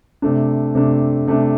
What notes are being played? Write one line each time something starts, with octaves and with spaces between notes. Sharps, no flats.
C3 A3 D4
C3 A3 D4
C3 A3 D4